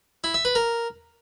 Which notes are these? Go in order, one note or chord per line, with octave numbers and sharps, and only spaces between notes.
E4
E5
B4
A#4